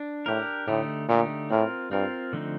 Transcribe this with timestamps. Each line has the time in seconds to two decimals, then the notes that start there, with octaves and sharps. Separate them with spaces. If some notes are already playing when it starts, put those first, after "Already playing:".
Already playing: D4
0.26 A2 D4 G4 A#4
0.67 A2 D3 A3 D#4 G4
1.08 A#2 D3 A3 D#4 G4
1.50 A2 C4 F4 A#4
1.91 G2 C4 F4 A#4
2.33 D3 F3 A3 C4 D#4